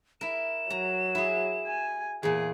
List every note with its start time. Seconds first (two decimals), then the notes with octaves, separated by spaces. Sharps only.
0.21 E4 A#4 E7
0.70 F#3 A#5
1.15 E4 G#4
1.67 G#5
2.23 E2 A#2 G#4